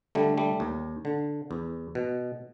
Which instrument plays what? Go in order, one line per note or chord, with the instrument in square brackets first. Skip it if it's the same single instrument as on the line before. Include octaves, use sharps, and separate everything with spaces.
[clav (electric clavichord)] D3 G3 A3
G3 A3
D#2
D3
E2
B2